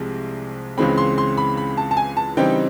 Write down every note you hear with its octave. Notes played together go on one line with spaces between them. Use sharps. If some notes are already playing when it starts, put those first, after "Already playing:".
Already playing: C2 C3 F3 G#3
C#2 C#3 E3 G#3 C4 B5
C6
C6
B5
B5
A5
A5
G#5
A5
C#3 E3 G3 C4 D#4 G5